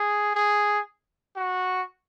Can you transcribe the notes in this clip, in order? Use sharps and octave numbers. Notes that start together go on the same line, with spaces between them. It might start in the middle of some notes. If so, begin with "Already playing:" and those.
Already playing: G#4
G#4
F#4